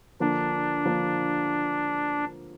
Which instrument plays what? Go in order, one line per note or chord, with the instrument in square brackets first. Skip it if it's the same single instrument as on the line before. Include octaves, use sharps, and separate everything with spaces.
[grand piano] D3 F3 A#3 [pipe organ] D4
[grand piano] D3 F3 A#3